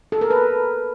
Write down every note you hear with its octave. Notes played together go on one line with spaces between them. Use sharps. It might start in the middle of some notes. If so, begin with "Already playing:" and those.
A4
A#4
B4